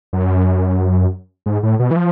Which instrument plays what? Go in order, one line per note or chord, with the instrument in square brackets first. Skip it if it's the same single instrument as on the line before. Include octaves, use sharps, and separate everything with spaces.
[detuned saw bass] F#2
G#2
A2
B2
E3
F3